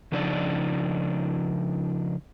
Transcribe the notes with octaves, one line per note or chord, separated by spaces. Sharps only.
C#3 F3 D4 D#4 D5